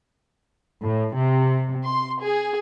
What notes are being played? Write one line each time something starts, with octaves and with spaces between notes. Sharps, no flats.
A2
C3
C6
G#4